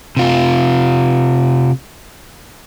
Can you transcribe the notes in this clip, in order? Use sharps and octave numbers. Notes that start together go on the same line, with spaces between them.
C3 F4